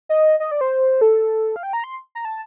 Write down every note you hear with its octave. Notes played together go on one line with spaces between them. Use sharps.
D#5
D#5
D5
C5
A4
F5
G5
A#5
C6
A#5
A5